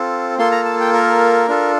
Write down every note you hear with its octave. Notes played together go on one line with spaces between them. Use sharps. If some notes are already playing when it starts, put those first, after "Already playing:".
Already playing: C4 F4 A4
A#3 F4 A4 C6
A#5
A5
G5
A#4
D4 F4 A4